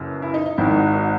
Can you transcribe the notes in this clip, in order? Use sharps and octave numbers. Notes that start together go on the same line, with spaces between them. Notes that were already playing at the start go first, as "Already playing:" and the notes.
Already playing: F#1 F#2 E3
E4
D#4
D#4
G#1 G#2 D#3 E4
D#4 F#4
D#4 F#4